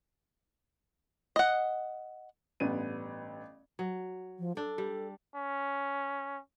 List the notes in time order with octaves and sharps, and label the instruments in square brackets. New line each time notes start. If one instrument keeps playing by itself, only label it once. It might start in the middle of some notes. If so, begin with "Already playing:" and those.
[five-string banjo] D#5 F#5
[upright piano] A1 G2 B3 D#7
[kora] F#3
[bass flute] F3
[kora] D4 [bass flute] A4
[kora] G3
[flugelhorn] C#4